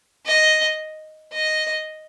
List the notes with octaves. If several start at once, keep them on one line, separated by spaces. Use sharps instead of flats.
D#5
D#5